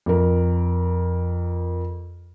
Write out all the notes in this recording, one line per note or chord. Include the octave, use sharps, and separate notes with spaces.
F2 A#4